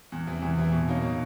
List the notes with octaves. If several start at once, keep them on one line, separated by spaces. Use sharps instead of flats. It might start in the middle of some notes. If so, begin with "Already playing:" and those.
E2
C3 E3
E2
C3 E3
B2
F#3 A#3 D#4
B2